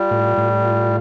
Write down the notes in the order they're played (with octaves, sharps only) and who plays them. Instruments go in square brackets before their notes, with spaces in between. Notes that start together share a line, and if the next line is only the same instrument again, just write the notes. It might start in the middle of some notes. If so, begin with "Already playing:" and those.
Already playing: [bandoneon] G3 [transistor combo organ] F4
[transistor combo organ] A2
A2
F4